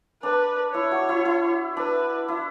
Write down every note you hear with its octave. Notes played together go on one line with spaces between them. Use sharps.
D4 B4
E4 C#5
F#4
E4
E4
D4 B4
E4